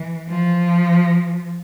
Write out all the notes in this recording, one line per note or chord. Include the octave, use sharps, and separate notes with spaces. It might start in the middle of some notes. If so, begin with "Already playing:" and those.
Already playing: E3
F3